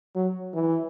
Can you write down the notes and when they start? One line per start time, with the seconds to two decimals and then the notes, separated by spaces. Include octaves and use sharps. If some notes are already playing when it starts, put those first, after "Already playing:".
0.15 F#3
0.54 E3